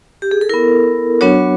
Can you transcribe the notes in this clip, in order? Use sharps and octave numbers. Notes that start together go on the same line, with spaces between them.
G4
G#4
A4
B3 E4 A#4
F#3 B3 D4 F#4 C#5